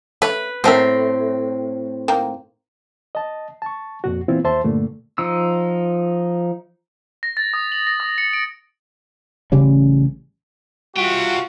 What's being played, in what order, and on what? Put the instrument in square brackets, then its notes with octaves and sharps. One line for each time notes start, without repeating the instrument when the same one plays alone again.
[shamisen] A3 C#5 [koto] B4
[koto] A2 C4 [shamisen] B3 A4 A#4
[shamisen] D#3 A#3 G5
[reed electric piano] D#5 A5
A5 C#6
F2 A#2 F#4
A#2 E3 B3 C4 E4 F4
D#2 C5 E5 A5 C6
G2 A#2 D3 A3
[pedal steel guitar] F3 D#4 E6
[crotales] A#6
A6
D#6
F#7
A#6
D#6
C#7
D7
[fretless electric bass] A1 C#3 G3 C#4
[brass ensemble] G3 F4 F#4 [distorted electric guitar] E5 G5